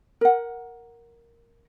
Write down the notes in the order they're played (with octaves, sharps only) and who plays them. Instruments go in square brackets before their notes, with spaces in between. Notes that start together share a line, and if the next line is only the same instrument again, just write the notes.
[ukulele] A#4 F#5